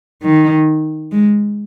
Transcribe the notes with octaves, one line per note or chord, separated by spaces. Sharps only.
D#3
G#3